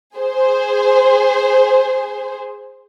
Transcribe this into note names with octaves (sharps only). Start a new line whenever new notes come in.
G#4 C5